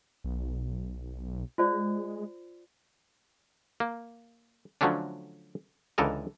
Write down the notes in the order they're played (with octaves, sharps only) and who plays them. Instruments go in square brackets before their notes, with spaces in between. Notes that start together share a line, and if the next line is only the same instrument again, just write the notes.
[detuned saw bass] B1
[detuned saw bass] G#3 [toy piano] F4 C5 D5
[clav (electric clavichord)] A#3
D3 F3 F#3 A3 C#4 D4
C#2 D3 E3 A4 A#4 D#5